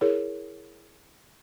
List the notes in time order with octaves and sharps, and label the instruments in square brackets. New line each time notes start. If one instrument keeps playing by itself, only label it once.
[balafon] E4 G#4 A#4 C#5